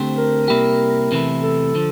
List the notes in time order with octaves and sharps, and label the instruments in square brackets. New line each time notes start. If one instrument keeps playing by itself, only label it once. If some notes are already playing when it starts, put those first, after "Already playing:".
Already playing: [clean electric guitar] D3 A3 C4 G4 C5
[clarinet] A#4
[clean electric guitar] C3 G3 A#3 E4 G4
E2 C3 E3 A3 E4
[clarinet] A4
[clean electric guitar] D3 F3